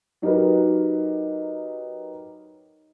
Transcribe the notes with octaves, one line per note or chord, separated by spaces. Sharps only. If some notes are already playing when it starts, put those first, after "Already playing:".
F#3 D#4 G4 A#4 B4